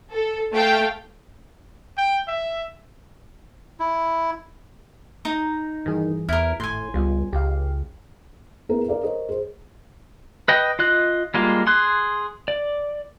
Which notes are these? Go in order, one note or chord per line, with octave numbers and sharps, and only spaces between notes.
A4
A3 F5 G5
G5
E5
E4
D#4 A#5
G2 D#3 E3 G#4
E2 E4 A#4 F6
G#1 A2 G#5 C6
C#2 G3 B3 F4
C#2 G4 F5
B3 E4 G#4 A#4
A#4 D5 F5
A#4 C5 C#5 D#5
G#4 C5
B4 D#5 G5
F4 D#5 F#6
G3 G#3 A#3 F4
G#4 C6 F#6
D5